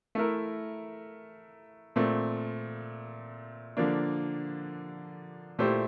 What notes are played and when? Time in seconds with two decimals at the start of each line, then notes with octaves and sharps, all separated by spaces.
0.15 A3 E4 A#4
1.96 A#2 A3 C4
3.77 D3 F3 A#3 D4
5.59 A#2 A3 E4 G4 C5